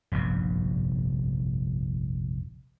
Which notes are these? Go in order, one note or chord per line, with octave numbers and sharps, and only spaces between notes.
F1 A#1 G2 C3